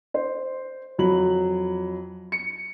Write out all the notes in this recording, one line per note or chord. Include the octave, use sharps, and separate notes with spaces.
C5
F2 F#3 B5 F#7
C#7